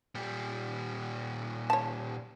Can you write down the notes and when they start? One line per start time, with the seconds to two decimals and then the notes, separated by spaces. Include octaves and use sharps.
0.15 A#2 G3
1.70 C#5 A5